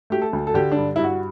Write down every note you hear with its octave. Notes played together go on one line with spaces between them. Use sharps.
A3 G4
A4
D2
A4
D3 G4
G2 D4
G2 E4
F#4